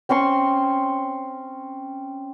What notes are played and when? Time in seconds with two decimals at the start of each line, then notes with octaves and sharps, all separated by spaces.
0.09 C4 C#4 C6 C#6